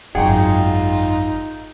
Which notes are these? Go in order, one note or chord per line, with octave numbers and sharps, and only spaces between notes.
G#1 F#2 D#4 F4 G#4 F#5 G5